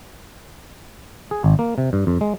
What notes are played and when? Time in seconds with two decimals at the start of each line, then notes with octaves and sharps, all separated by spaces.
1.31 G#4
1.44 G#1
1.59 A#3
1.78 C3
1.93 G2
2.07 F2
2.21 G#3